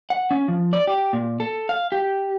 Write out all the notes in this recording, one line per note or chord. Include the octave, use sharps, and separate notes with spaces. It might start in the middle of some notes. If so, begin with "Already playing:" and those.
F#5
C#4
F3
D5
G4
A#2
A4
F5
G4